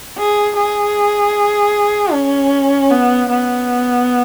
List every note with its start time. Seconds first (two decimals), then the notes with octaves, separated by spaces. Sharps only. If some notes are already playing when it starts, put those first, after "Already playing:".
0.18 G#4
0.57 G#4
2.13 C#4
2.91 B3
3.30 B3